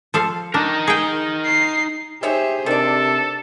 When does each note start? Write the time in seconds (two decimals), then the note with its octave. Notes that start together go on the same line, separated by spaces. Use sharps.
0.14 F3 A4 F5
0.54 D4 D#4 A#4
0.87 G#4 G5
1.46 C7
2.23 D#4 G4 G#4 C5 C#5 E5
2.66 C3 D#3 D4 A4 D5